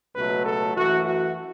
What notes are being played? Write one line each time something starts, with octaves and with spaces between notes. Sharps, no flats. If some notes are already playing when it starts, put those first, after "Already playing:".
C#2 B2 F#3 A3 B4
A4
F#2 E3 A3 F#4
F#4